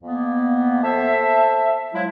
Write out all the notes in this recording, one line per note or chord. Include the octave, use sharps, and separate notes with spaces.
F2 A#3 B3
A4 C5 E5
F3 F#3 G#3 E4